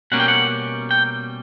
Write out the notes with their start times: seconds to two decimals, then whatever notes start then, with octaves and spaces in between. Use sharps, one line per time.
0.12 B2 G3 A#3 C#4 F#5
0.20 G5
0.28 F#5
0.91 G5